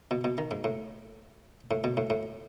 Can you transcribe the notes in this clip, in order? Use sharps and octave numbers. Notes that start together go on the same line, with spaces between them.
B2
B2
D#3
G#2
A2
A2
B2
A2
A2